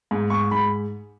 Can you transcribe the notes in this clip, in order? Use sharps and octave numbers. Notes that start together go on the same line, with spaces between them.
G#2
G#2 C#6
G#2 B5